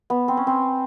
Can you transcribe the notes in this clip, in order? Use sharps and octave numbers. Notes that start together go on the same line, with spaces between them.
B3
C4
C#4
C4